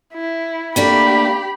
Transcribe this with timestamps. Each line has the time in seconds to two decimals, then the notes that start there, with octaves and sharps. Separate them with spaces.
0.14 E4
0.76 A3 A#3 D4 G4 B5